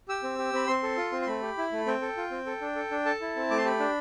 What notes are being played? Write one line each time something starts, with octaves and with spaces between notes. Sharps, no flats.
G4 E6
C4
G4
C4 B5
C4 C6
A4
F4
C4
C6
A3 B5
G4
E4
A3
C4 G5
A4
F4
C4
A4
D4
A4
D4
A4 A5
E4
C4
A3 D6
C6
G4 B5
D4